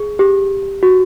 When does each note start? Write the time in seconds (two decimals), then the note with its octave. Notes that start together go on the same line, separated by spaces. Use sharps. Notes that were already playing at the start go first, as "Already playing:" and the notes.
Already playing: G#4
0.19 G4
0.83 F#4